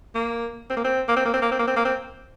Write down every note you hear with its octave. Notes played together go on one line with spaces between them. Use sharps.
A#3
C4
A#3
C4
A#3
C4
A#3
C4
A#3
C4
A#3
C4
A#3
C4